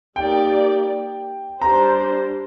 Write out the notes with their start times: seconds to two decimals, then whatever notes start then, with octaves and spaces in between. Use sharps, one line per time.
0.16 G3 A#3 D#4 G4 D5 G5
1.62 G3 D4 G4 C5 A#5